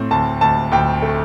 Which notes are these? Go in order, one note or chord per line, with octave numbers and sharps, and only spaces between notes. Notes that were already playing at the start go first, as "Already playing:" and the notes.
Already playing: A2 C4
D2 A5
D2 A5
D2 G5
A3